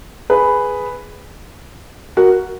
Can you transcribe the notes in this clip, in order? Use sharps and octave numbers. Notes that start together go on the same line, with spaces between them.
G#4 B4
F#4 A#4